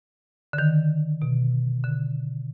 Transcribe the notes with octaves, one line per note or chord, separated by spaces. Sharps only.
D3
D#3
B2
D3